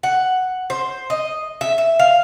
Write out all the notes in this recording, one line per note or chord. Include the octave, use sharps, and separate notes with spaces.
F#5
C5
D#5
E5
E5
F5